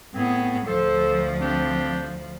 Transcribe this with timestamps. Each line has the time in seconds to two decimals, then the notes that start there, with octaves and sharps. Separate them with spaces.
0.15 A2 B3 C4 G#4
0.67 D2 F3 A4 C5
1.40 C4 D4 G4